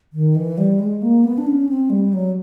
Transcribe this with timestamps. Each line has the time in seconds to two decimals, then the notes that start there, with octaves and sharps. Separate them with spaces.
0.13 D#3
0.36 E3
0.58 G3
0.79 G#3
1.02 A#3
1.24 B3
1.38 D4
1.47 C#4
1.69 C4
1.90 G3
2.13 F#3